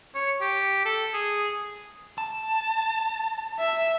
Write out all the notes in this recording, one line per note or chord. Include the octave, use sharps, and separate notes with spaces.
C#5
G4
A4
G#4
A5
E5